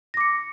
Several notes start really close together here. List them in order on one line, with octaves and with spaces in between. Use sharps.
A#6 D6 C#7